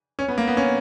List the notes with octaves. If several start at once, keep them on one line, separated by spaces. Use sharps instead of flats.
C#4
B3
A#3
B3
C#4